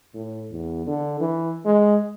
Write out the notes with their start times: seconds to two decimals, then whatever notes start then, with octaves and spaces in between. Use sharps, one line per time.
0.14 A2
0.52 E2
0.87 D3
1.20 E3
1.65 G#3